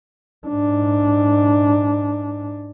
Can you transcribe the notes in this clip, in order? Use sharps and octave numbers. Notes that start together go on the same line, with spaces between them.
G#2 D4